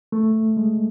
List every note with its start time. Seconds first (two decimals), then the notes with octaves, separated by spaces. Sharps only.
0.12 A3
0.57 G#3